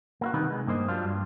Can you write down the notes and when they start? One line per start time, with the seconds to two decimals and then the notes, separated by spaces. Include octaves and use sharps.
0.21 A#3 E4 F#4
0.33 C3 D#3 G3 D#4 A#4 B4
0.50 G#3
0.67 G2 A#3 C5 D#5
0.88 F#3 G3 D4 F4
1.04 G2